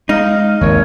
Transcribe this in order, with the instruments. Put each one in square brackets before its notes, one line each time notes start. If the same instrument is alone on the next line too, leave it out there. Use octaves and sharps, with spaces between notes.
[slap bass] G#3 [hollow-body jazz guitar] D#4 [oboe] F5
[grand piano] G#1 [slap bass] D#2 C3 [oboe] C#5